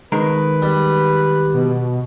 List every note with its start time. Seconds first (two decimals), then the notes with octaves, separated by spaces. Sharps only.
0.12 D#3 G#3 A#4 B4
0.62 G3
1.54 B2